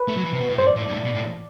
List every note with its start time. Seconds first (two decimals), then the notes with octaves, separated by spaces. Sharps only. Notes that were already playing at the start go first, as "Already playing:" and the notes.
Already playing: B4
0.08 A3
0.17 F#3
0.24 E3
0.33 C3
0.41 B2
0.49 A2
0.58 G2 C5
0.67 D5
0.76 A2
0.83 G2 D5
0.92 A2
1.04 B2
1.14 A2